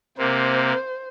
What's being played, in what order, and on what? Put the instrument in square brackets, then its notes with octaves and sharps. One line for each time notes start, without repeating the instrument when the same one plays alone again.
[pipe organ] C3 A#3 [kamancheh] C5